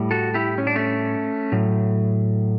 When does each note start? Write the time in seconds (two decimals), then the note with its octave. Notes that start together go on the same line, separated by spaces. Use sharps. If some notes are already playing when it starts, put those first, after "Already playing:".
Already playing: A2 G3
0.11 F#4 A4
0.34 E4 G4
0.58 C#4
0.67 D4
0.76 A3 C#4
1.52 A2 F#3